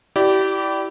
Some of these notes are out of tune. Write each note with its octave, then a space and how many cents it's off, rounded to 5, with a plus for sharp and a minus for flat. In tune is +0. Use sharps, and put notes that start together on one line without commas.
E4 +0 G4 -25 D5 +0